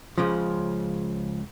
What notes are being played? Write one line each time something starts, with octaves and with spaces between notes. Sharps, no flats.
C#2 C#3 F3